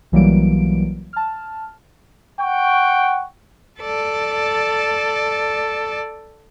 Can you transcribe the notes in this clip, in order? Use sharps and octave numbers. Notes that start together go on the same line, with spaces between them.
B1 E3 F#3 G3 A#3 D7
A5 F6
F#5 G5 C#6
A4 D5